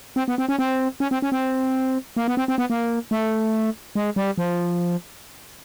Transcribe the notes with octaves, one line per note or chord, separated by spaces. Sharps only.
C4
B3
C4
C#4
C4
C#4
C4
C#4
C4
A#3
B3
C4
C4
B3
A#3
A3
G#3
G3
F3